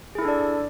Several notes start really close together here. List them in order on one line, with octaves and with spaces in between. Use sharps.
G#4 E4 A4 D4 D5